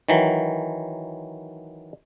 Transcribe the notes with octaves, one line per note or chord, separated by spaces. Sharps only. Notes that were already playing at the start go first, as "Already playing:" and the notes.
D#3 E3 F#3